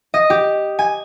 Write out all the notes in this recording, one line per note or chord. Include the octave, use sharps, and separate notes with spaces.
D#5
G4
G#5